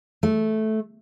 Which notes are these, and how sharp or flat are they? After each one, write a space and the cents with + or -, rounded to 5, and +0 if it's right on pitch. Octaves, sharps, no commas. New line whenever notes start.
A3 -10